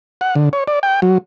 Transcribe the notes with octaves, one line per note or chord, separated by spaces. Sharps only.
F#5
D3
C#5
D5
G5
F#3